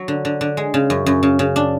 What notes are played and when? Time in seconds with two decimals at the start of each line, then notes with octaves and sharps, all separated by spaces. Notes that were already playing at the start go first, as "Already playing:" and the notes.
Already playing: F#3
0.08 D3
0.25 D3
0.41 D3
0.57 G#3
0.74 C#3
0.90 F#2
1.06 F#2
1.23 C#3
1.39 C#3
1.56 D4